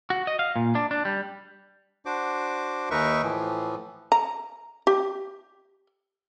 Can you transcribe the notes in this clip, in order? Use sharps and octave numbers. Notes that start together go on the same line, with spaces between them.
F#4
D#5
F5
A#2
D4
D4
G3
D4 F#4 C5 D6
D#2 D#4 A#4 B4 E5 C#6
A2 E3 F3
A#5
G4